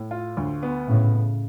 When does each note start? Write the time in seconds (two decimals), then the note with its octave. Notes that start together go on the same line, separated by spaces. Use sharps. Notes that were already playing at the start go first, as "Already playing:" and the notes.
Already playing: A2
0.11 F4
0.37 D2
0.63 B3
0.88 A2 C#3
1.14 C#3